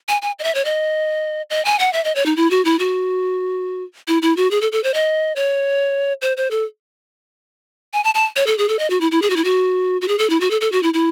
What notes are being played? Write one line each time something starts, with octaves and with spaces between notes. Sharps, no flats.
G#5
G#5
D#5
E5
C#5
D#5
D#5
G#5
F#5
E5
D#5
C#5
D#4
E4
F#4
E4
F#4
E4
E4
F#4
G#4
A4
A4
C5
D#5
C#5
C5
C5
A4
G#5
A5
A5
C#5
A4
G#4
A4
D#5
F#4
E4
E4
G#4
F#4
E4
F#4
F#4
G#4
A4
E4
F#4
A4
A4
F#4
E4
E4